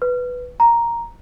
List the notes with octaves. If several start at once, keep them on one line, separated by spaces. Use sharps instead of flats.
B4
A#5